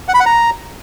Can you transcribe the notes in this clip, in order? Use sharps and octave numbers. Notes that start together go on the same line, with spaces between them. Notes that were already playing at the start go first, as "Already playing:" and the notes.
F#5
B5
F#5
A#5